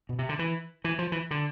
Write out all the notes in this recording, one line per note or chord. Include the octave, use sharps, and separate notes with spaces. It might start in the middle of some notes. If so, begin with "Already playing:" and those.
B2
C3
D3
E3
E3
F3
E3
D3